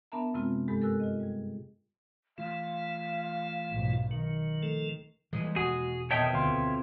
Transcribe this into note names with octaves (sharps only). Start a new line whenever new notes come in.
B3 D4 A#4 E5 A5 A#5
F#2 C3 G#3 C4 F4
G2 G#3 G4 A4 G#5 B5
A4 A#4 G#5 E6 F#6
F4 D#5
G3 G#4
E3 A3 F4 F5
B1 G#2
D#3 F#3
F3 A3 A4
D#2 E3 G3 G#3 D#5
E1 F#4 G#4
F2 B2 D#3 C#5 D#5 E5 G5 A5
D2 F5 C6